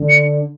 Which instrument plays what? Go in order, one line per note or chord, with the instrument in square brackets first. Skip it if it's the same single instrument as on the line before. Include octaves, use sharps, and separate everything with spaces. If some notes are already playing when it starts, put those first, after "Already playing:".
Already playing: [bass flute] D3
[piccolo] C#7